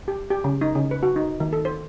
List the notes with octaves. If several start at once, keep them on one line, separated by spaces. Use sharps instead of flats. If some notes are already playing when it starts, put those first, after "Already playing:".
G4
G4
C#3
D#4
C#3
B4
F#4
D#4
D#3
A4
C5